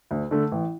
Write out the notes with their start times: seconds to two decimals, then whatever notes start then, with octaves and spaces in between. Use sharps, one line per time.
0.11 D2
0.31 D3 A3
0.52 A1